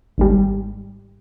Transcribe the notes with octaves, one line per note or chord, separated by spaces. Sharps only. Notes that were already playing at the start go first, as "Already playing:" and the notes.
G#1 G#2 G3